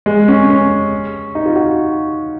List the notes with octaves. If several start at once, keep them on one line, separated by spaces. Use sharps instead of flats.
G#3
C#4
C#4
D#4
F4
F#4